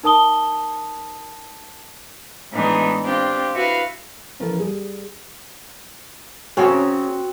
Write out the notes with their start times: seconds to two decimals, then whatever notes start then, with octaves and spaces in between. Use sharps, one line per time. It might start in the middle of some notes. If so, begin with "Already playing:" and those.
0.03 D#4 A#4 A5 D#6 G7
2.52 A2 E3 G#3 B3 D4 D#4
3.04 C4 D4 F4 G4
3.54 E4 F#4 B4 E5 F5
4.40 C#3 E3 F3 F4 A4 A#4
4.60 G3 G#4
6.57 C#3 A#3 C4 C#4 F#4